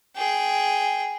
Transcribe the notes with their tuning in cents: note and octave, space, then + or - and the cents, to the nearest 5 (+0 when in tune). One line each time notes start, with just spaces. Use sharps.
G#4 +0 G5 -5